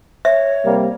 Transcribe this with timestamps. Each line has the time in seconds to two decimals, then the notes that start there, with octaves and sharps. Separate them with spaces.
0.25 C#5 E5
0.64 C3 G3 A#3